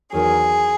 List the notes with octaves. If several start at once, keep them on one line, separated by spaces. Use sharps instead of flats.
E2 D#3 F#3 G#4